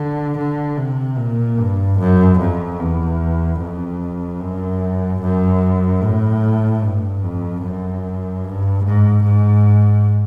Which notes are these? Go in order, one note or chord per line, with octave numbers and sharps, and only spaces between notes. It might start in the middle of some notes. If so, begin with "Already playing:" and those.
Already playing: D3
D3
C3
A#2
G2
F#2
F2
E2
F2
F#2
F#2
A2
G2
F2
F#2
G2
G#2
G#2